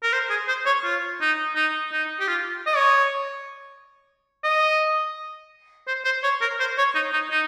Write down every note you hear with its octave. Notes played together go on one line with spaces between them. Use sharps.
A#4
C5
G#4
C5
C#5
F4
D#4
D#4
D#4
G4
F4
D#5
C#5
D#5
C5
C5
C#5
A#4
C5
C#5
D#4
D#4
D#4